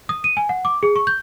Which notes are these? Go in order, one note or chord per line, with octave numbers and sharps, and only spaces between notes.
D#6
D#7
G#5
F#5
D6
G#4
C#6
G6